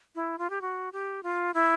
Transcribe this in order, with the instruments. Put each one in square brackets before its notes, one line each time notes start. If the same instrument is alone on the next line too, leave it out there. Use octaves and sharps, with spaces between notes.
[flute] E4
F4
G4
F#4
G4
F4
E4